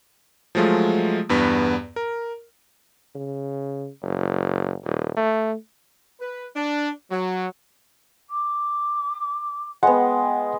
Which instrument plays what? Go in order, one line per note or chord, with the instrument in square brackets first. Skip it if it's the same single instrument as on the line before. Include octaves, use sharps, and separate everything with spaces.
[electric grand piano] F3 F#3 G#3 A3 F4
E2 G2 B3
A#4
[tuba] C#3
F#1
D#1
A3
[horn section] B4
D4
F#3
[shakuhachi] D6
[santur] G#3 B3 [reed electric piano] F#5 [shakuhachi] G5